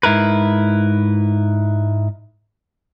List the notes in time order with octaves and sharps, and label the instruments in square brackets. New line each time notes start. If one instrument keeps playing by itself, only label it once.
[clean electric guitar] G#2 E4 A#4 B4